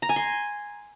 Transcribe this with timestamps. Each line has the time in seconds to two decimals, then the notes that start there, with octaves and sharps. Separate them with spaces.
0.02 A#5
0.09 G#5
0.16 C6